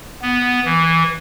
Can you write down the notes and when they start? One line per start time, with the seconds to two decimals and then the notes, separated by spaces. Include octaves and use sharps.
0.22 B3
0.65 E3